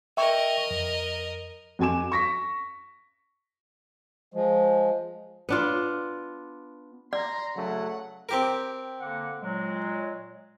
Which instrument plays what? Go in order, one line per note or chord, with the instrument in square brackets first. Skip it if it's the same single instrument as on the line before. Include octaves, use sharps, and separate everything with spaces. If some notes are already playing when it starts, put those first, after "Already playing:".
[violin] A#4 D#5 [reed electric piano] E5 G5 C#6
[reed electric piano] F2
[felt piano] F2 F#4 G#5 D6 E7
C#6 A#6 B6
[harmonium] F3 G#3
[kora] B3 D4 F4
[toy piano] D5 [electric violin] A#5 C6
[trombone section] C#3 F#3 A3 [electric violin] F#5
[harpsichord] C4 G4 A#4
[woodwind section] D3 A#3 F#5
A#2 F#3 G#3